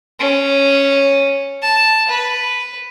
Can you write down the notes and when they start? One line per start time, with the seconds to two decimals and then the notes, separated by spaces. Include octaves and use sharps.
0.20 C#4
1.62 A5
2.09 B4